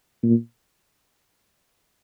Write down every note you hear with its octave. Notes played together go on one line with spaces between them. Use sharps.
A#2